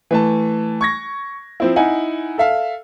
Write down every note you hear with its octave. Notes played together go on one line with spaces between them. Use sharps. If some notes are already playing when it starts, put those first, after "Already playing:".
E3 A3 A5
C#6 G#6 A#6
F3 C4 E4
D#4 E4 F#5 G#5
A4 E5 F5